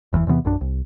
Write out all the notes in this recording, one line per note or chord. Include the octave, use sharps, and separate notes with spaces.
F#1 E2 G#2 E3
E2 C3 E3 B3
A#1 F#2 D4
C2